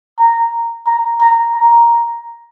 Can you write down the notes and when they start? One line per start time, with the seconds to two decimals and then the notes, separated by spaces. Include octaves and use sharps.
0.19 A#5
0.87 A#5
1.21 A#5
1.55 A#5